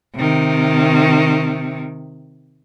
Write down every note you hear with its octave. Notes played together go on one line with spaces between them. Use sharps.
C3 D#3